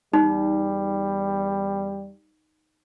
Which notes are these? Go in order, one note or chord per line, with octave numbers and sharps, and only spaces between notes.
E2 G3 D#4